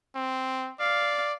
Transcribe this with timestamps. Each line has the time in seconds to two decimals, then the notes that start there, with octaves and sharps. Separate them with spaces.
0.15 C4
0.80 D5 F5